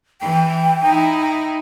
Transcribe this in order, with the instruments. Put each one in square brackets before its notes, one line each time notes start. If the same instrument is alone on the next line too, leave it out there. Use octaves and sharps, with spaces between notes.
[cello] E3 [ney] G5
[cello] D#4 E4